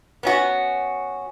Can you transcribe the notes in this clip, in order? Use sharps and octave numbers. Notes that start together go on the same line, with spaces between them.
B3 C#4 F#4